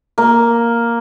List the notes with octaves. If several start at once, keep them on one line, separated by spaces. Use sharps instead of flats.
A#3